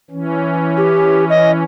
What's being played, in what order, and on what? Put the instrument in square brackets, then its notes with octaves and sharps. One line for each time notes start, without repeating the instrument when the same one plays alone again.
[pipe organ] E3 C#4
[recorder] G4
D#5